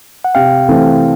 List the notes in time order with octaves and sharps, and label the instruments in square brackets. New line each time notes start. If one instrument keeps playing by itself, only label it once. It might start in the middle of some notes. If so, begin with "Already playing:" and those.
[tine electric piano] F#5
[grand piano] C3 [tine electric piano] F5 G5
[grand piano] E3 A3 C4